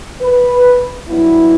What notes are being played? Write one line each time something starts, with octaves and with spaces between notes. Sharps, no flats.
B4
G2 F#3 B3 E4